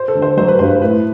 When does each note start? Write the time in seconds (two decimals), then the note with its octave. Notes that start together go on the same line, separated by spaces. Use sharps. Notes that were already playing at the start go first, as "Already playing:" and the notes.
Already playing: C5
0.08 A4
0.15 D3
0.22 C5
0.37 F#3 C5
0.48 B4
0.59 G2 C5
0.70 B4
0.81 A2 B4